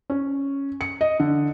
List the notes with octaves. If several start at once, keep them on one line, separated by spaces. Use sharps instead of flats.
C#4
C#7
D#5
D3